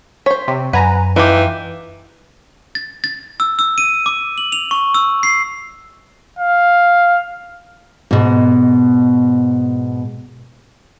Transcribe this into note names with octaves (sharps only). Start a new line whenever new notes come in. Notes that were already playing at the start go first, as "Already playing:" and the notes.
C5 C#5 B6
C3
F#2 B4 F#5 G#5 A#5
E3 D#4 F4 G4
A6
A6
E6
E6
D#7
D6
F#7
F7
C#6
E6
C7
F5
G#2 B2